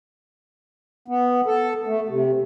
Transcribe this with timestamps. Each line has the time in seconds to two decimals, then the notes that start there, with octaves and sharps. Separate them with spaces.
1.08 B3
1.46 A4
1.87 A3
2.09 C3